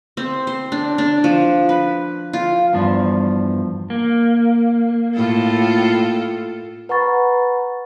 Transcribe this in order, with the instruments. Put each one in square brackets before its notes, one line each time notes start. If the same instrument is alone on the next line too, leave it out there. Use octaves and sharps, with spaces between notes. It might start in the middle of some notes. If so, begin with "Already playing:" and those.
[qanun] C4
C5
D4
D4
F3
B4
F4
[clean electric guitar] E2 G2 F3
[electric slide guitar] A#3
[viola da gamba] A2 F4 A4
[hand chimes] B4 F#5 A#5 B5 C#6 A6